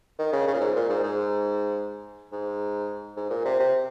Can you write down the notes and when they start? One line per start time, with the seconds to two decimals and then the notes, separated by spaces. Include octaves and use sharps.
0.19 D#3
0.33 C#3
0.48 C#3
0.54 A#2
0.61 G#2
0.76 A#2
0.90 G#2
1.03 G#2
2.32 G#2
3.17 G#2
3.31 A#2
3.45 C3
3.60 C3